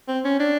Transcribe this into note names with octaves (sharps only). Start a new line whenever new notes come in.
C4
C#4
D4